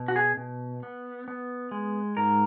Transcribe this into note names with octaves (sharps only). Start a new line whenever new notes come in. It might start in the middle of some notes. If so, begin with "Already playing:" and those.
Already playing: B2
F#4
G#4
B2
B3
B3
G#3
G#2 A#4